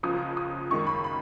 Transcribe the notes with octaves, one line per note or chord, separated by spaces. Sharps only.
C#2 C#3 F3 D#6
D#6
F#2 D#3 G#3 C#6
B5
B5